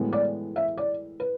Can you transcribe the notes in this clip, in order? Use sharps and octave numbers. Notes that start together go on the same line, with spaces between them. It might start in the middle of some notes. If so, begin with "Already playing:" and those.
Already playing: A2 E3 G#3 B3
D5
E5
D5
B4